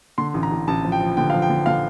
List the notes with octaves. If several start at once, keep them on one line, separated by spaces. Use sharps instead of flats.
D3 C6
A1
A#5
A1
A1 A5
F3
G5
F3
D3 G5
F3 F5
G5
D3
D3 F5